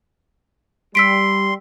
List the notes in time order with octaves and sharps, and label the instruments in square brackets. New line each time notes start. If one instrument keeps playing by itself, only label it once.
[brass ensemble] G3 [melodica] C6 [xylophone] E6 B6 D7